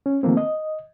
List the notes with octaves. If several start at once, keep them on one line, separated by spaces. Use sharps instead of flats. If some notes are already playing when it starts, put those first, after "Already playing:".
C#4
D#3 F3 A3 A#3 C4
D#5